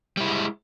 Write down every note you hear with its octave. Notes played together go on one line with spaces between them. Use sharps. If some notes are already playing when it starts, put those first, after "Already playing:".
G3 G#3 E4